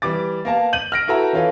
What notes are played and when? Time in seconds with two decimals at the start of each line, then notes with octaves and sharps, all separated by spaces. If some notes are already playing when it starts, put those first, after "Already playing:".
0.02 E3 G3 D6 A6
0.45 A#3 B3 A#4 F5 A5
0.73 G6 D#7 F#7
0.92 F6 A#6 D7
1.08 E4 F#4 A4 B4 E5 A#5
1.33 E3 C#4 F4 A4 B4